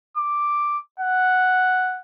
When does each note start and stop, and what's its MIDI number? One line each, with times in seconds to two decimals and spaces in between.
0.17 0.78 86
1.00 2.00 78